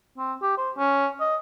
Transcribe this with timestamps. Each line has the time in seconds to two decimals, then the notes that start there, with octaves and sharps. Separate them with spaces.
0.18 C4
0.42 G4
0.57 C5
0.77 C#4
1.20 D#5